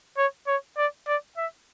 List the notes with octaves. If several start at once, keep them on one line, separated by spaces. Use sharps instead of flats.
C#5
C#5
D5
D5
E5